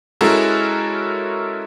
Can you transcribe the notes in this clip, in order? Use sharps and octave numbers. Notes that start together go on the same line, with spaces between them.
G#3 C#4 E4 F#4 A4 A#4